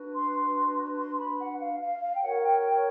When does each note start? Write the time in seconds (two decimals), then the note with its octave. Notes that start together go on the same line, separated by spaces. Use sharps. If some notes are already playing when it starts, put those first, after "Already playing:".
Already playing: D4 F#4 B4
0.14 C6
0.96 C6
1.18 B5
1.38 F#5
1.60 F5
1.80 F5
2.01 F5
2.13 G5
2.21 F#4 A#4 C#5 F#5
2.37 F#5
2.43 G5
2.64 G5